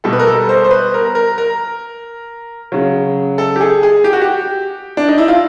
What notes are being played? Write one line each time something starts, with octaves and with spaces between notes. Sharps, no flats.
B2 G3 A4
B4
A#4
A4
C5
C5
B4
A#4
A#4
A#4
C#3 F#3
A4
G4
G#4
G#4
G4
F#4
G4
D4
D#4
E4
F4